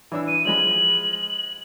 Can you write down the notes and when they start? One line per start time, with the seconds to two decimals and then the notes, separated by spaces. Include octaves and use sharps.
0.12 E3 D4 E6
0.28 D#7
0.45 F3 G#3 B5 F#7